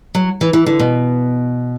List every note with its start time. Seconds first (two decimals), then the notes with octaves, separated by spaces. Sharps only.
0.15 F#3
0.41 E3
0.53 E3
0.66 D3
0.80 B2